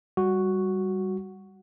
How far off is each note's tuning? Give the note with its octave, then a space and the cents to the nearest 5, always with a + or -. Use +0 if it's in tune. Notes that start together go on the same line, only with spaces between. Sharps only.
G3 +0 F#4 +0